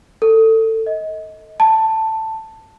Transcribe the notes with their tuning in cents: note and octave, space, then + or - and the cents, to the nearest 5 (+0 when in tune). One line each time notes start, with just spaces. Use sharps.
A4 +20
D#5 +25
A5 +10